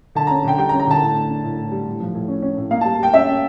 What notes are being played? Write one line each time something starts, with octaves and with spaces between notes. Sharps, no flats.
D3 A5
A#5
C#4
D3 G5
G3 G5
A#5
C#4
A#5
D3 A5
A2
D4
D4
A2
A2
G3
A2
F3
A2
C#4
C#4
A2
A#3 F5
A5
G3
G3 G5
C#4 E5
C#4